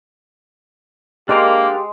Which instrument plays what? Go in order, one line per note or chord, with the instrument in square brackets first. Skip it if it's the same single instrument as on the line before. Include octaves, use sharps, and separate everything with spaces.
[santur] G#3 C5 D6 [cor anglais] A#3 [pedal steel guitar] D4 A#4 F5 [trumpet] G4